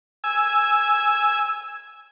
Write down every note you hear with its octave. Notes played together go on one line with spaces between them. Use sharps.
G#5 E6